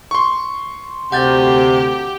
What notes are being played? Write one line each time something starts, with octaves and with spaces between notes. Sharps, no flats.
C6 C#6
D2 C3 G4 F#5 G6 A6